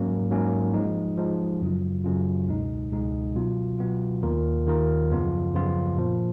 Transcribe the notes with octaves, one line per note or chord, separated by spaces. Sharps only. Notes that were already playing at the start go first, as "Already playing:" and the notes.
Already playing: G#2 F#3 A#3 C#4
G#2 F#3 A#3 C#4
F3 G#3 D#4
F3 G#3 D#4
F#2 C#3 F#3 C#4 F4
F#2 C#3 F#3 C#4 F4
C#2 B2 G#3 D#4
C#2 B2 G#3 D#4
B2 F#3 B3 F4
B2 F#3 B3 F4
D#2 D#3 A#3 F4 A#4
D#2 D#3 A#3 F4 A#4
F#2 C#3 F3 B3 F4
F#2 C#3 F3 B3 F4
A#2 F3 A#3